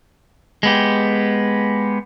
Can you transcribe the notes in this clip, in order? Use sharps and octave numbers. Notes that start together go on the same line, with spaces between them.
G#3 B3 G4